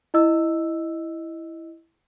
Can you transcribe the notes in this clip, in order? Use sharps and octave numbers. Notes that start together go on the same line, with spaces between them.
E4 D#5 E6